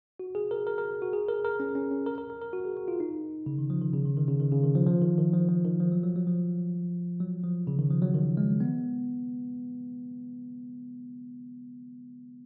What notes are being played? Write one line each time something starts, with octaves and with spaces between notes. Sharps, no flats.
F#4
G#4
A#4
A#4
A#4
F#4
G#4
A#4
A#4
C#4
C#4
C#4
A#4
A#4
A#4
A#4
F#4
G#4
F#4
F4
D#4
C#3
D#3
F3
D#3
C#3
D#3
D#3
C#3
D#3
C#3
D#3
F3
F3
D#3
D#3
F3
F3
D#3
F3
F#3
F#3
F#3
F3
F#3
F3
C#3
D#3
F3
F#3
D#3
G#3
B3